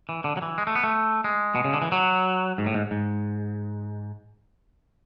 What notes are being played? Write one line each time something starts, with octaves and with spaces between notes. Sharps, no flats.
E3
D3
F#3
E3
G#3
A3
B3
A3
G#3
B2
C#3
D3
E3
F#3
G#2
A2
G#2
G#2